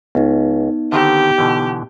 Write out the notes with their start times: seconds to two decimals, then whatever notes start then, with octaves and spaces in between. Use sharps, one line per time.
0.15 C#2 B3 D#4
0.92 D3 D#3 C4 G4
1.38 B2 D3 E3